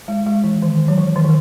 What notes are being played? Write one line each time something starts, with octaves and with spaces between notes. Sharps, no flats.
G#3
G#3
E3
D#3
F#3
E3
D#3
E3